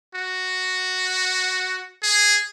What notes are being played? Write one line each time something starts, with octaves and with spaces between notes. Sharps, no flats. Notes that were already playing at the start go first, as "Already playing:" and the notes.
F#4
G#4